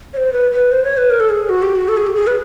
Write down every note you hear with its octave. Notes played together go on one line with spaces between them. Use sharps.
C#5
C5
B4
B4
C5
C#5
B4
A#4
A4
G#4
F#4
G4
F#4
A4
G#4
G4
G#4
B4